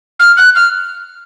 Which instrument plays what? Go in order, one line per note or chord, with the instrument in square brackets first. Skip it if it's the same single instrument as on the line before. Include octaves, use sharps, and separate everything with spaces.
[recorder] F6
F#6
F6